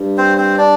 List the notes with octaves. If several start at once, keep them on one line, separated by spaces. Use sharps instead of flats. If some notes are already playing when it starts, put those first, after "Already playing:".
Already playing: G2
C4 C5
C4 C5
D4 D5